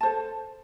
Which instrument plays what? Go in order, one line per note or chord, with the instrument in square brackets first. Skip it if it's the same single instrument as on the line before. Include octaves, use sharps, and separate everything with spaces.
[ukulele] A5
C5
A4